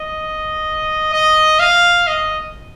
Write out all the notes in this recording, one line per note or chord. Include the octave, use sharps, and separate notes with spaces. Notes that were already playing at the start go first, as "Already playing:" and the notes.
Already playing: D#5
D#5
F5
D#5